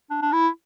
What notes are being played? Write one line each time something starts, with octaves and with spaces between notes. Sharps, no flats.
D4
D4
E4